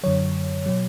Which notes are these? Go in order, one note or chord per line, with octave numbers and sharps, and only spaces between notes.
F#2 D3 F#3 C#5
B2 F#3